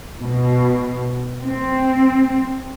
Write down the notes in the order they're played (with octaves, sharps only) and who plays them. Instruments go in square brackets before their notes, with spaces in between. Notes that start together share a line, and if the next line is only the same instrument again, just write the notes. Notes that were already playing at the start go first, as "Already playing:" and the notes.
[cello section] B2
C4